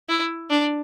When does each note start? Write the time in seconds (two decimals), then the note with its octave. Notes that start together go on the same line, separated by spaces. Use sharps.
0.09 E4
0.50 D4